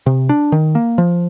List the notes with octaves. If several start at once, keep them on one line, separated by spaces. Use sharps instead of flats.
C3
D4
D#3
A#3
F3